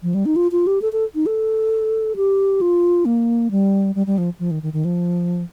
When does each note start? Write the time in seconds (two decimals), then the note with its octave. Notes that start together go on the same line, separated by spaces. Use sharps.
0.03 F3
0.14 G3
0.26 D#4
0.36 F4
0.52 F4
0.67 G4
0.82 A4
0.93 A4
1.15 D#4
1.26 A4
2.16 G4
2.61 F4
3.05 A#3
3.51 G3
3.95 G3
4.07 G3
4.18 F3
4.39 F3
4.51 D#3
4.63 D#3
4.73 D#3
4.85 F3